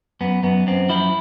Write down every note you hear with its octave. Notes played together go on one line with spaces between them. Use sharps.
F#2 B3
F#2 B3
F#2 C4
F3 E4